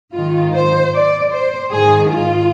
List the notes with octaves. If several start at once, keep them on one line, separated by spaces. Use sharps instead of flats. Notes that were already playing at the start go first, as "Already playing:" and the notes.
G#2 D#3 F4
C5
D5
C5
G#2 D#3 G#4
F4